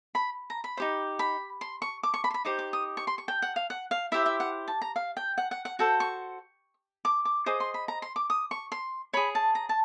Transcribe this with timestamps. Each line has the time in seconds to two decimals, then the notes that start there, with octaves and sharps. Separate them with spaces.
0.15 B5
0.50 A#5
0.64 B5
0.77 D#4 G4 C5
1.19 B5
1.61 C6
1.82 C#6
2.03 D6
2.14 C#6
2.24 B5
2.30 C6
2.34 B5
2.45 D#4 G4 C5 D6
2.59 D6
2.73 D#6
2.97 C#6
3.07 C6
3.18 C#6
3.28 G5
3.42 F#5
3.56 F5
3.70 F#5
3.91 F5
4.12 E4 G4 C5 E5
4.26 E5
4.40 F#5
4.68 A5
4.82 A#5
4.96 F5
5.17 G5
5.38 F#5
5.51 F#5
5.65 F#5
5.79 F#4 A4 C5 G5
6.00 C#6
7.05 D6
7.25 D6
7.46 G#4 C5 D#5 D6
7.60 C6
7.74 B5
7.88 A#5
8.02 C6
8.16 D6
8.30 D#6
8.51 C#6
8.72 C6
9.13 G#4 C#5 B5
9.35 A5
9.55 A#5
9.69 A5